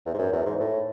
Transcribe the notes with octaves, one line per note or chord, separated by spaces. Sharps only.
E2
G#2
F#2
E2
G#2
A2